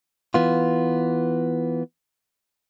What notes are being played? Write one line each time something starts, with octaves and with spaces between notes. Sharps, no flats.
E3 B3 F4